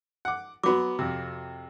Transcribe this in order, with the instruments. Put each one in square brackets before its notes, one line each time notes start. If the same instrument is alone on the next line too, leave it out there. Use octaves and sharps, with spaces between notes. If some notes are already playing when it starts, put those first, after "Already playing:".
[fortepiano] F#5 D6
[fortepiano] F#3 B3 [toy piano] F#4 D6
[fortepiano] F2 C3